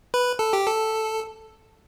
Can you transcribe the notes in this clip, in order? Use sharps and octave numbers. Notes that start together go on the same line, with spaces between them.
B4
A4
G4
A4